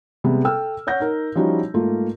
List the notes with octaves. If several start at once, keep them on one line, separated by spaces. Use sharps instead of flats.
C3 G3 G#3 B3
A4 G5 E6 F6
C#5 F#5 G6 A#6
D#4 A#4
F3 G3 C#4 D#4 E4 F#4
G#2 A3 A#3 F4